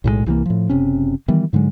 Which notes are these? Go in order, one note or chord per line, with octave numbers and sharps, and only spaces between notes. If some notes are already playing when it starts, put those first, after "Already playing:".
B1 A2 D#3 G#3
C2 E3 F3 A#3
A2 F3
F#1 C3 C#4
D#3 E3 G3 B3
G#2 D3 F#3 G#3